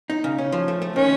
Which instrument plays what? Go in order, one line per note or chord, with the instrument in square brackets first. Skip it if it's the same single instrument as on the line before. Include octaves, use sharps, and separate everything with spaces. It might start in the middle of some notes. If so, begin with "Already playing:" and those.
[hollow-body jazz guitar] D#4
C#3
C#4
F3
A3
A3
[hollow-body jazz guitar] D#3 [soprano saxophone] C#4